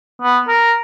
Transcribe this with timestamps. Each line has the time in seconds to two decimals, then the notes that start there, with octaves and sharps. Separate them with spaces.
0.22 B3
0.48 A#4